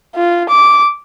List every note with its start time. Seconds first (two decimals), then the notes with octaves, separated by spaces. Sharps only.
0.15 F4
0.49 D6